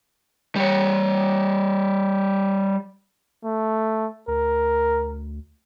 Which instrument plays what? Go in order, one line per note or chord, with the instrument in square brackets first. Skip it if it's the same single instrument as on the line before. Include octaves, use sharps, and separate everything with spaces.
[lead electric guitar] G3 C#5
[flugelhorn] A3
[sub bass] D2 [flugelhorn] A#4